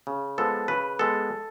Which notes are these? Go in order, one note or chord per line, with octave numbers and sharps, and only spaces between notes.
C#3
F3 G#3 B3 A4
C#3 B4
G#3 B3 A4